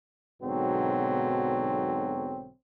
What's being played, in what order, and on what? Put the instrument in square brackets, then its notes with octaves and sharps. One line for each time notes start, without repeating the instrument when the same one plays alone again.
[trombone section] B1 G#2 B2 D3 F#3 C4